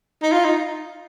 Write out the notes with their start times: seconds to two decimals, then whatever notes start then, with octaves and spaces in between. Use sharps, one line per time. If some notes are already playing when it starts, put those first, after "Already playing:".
0.22 D#4
0.32 F4
0.44 D#4